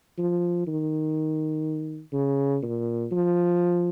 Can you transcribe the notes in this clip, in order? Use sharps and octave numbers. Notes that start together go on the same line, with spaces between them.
F3
D#3
C#3
A#2
F3